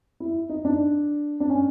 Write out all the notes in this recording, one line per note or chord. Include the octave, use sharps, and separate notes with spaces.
E4
D#4
D4
D4
C#4